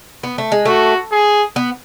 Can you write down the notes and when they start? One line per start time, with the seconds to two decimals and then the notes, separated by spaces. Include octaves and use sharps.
0.23 B3
0.38 A3
0.52 G#3
0.65 A3 F#4
1.12 G#4
1.56 B3